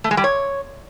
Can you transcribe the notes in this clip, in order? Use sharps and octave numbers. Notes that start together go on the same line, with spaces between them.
A3
G#3
G3
C#5